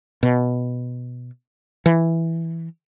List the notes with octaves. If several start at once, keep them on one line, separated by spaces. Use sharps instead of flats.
B2
E3